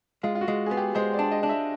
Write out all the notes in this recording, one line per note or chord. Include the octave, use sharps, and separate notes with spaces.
G#3 F4
F4
F#4
G#3
B3 G#4
G4
G#3 C5
D5
D4
D#5
D4
E5